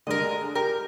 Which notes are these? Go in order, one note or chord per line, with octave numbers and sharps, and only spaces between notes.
D3 G3 G#3 A#4 D#5
G4 A#4